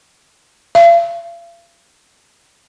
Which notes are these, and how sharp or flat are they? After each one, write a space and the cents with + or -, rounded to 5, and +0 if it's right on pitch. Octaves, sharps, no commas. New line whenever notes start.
F5 -45